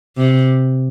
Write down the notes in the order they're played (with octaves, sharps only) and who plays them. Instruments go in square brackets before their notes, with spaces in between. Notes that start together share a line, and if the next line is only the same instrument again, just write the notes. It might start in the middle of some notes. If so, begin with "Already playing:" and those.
[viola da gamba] C3